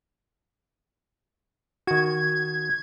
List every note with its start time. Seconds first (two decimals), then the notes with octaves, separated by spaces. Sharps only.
1.87 D#3 F#4 G#6